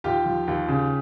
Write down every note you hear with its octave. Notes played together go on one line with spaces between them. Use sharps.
D#2 F4 G4
F3
D#2
C#3